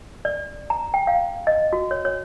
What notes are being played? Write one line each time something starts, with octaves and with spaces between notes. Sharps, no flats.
D5
A#5
G5
F5
D#5
F#4
C#5
C#5